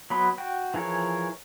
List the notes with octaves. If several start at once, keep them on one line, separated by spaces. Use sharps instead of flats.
F#3 B3 B5 C6 D#6
F#4 G5
E3 F3 G#4 A#4 C#5